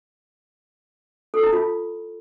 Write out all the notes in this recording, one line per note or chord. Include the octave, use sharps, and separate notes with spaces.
A4
E4
F4